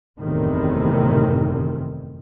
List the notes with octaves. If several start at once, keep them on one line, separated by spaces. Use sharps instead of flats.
F#1 E2 A2 C3 D#3